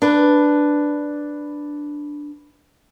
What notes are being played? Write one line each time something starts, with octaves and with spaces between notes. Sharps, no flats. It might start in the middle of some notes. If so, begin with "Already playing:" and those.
D4 B4